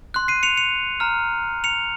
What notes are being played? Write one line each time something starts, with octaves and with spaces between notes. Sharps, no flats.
C6 F#6
C7 D#7
C#7 F7
C#7 F7
A#5 F6
C#7 F7